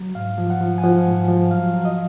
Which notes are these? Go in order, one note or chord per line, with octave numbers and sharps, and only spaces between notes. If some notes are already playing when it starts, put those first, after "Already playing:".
Already playing: F#3
G#2 F5
F3
F#5
F3
G#5
F3 F#5
G#2
F3
F#3 F5
F#3
D#5